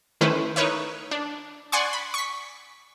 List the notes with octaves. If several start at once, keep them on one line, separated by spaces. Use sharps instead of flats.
D#3 A3 C#4 E4 B4 C5
D#4 A#4 B4 C#5 E5
D4
D5 F#5 G#5 C6 C#6
B5
C#6 B6